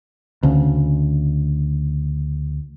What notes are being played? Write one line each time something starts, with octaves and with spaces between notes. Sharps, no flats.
D2 C#3